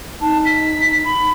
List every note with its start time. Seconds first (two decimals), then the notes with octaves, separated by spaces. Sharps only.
0.21 D#4 A5
0.45 B6
1.04 B5